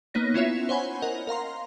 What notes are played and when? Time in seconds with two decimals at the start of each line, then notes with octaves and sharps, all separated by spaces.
0.14 A#3 B3 D#4 C#5 A#6
0.34 B3 C#4 E4 F4 C#5 E5
0.69 C5 C#5 F#5 G#5 B5
1.02 A#4 D#5 F#5
1.27 A#4 F5 A#5 C6